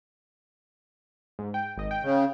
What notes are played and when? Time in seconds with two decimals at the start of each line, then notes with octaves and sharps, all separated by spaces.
1.39 G#2
1.54 G5
1.77 G#1 D#5
1.91 G5
2.03 C#3